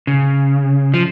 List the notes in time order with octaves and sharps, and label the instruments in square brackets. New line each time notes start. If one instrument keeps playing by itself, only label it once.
[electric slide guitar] C#3
F3